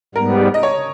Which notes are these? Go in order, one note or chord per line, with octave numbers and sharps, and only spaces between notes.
G#2 G3 B3 A#4
D#5
C#5